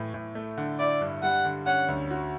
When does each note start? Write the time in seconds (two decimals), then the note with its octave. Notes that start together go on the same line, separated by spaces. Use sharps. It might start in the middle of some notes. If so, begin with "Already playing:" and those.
Already playing: A2 E3 A3
0.14 A2
0.35 A3
0.58 D3
0.79 E4 D5
1.01 G2
1.23 G3 F#5
1.45 D3
1.66 C#4 F#5
1.88 D2
2.11 F#4